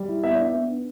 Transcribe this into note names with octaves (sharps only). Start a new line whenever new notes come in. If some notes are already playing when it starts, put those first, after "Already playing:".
Already playing: G3
E4
B3 E5
D4 D5
E5
B3
D4